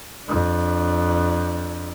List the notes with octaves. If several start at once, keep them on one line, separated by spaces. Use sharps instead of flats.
F2 D4